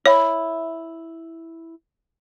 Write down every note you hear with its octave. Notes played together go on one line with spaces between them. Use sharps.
E4 C#5